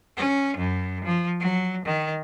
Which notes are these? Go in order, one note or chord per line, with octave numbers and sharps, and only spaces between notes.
C#4
F#2
F3
F#3
D#3